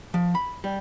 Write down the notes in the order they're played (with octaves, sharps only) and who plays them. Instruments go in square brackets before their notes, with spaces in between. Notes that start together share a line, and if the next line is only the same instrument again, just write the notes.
[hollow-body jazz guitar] F3
B5
G3